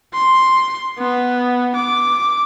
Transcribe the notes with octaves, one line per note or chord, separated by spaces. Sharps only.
C6
B3
D6